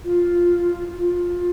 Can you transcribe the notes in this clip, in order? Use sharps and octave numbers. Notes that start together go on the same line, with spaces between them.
F4
F4